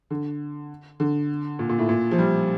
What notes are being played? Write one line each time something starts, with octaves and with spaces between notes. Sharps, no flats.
D3
D3
A#2
A#2
A2
A#2
F3
G3